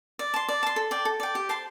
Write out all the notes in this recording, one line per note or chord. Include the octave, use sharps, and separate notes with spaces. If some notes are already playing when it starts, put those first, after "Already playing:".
D5
A5 C6
D5
A5 C6
A4
D5 G5
A4
D5 G5
G4
C5 A5 C6